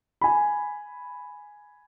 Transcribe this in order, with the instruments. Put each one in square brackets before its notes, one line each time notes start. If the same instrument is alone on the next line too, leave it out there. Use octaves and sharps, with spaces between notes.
[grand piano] G#5 B5